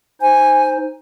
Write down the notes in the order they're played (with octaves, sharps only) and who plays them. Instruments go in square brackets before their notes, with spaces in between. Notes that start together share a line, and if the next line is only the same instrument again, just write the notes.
[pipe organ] D#4 C5 [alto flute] G#5